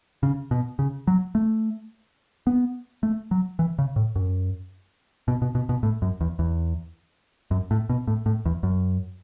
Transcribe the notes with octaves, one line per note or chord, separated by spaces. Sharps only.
C#3
B2
C#3
F#3
A3
B3
A3
F#3
E3
C#3
A2
F#2
B2
B2
B2
B2
A2
F#2
E2
E2
F#2
A2
B2
A2
A2
E2
F#2